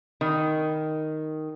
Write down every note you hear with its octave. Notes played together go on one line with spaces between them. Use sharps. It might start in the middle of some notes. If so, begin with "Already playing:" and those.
D#3